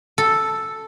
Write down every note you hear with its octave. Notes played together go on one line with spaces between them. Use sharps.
A4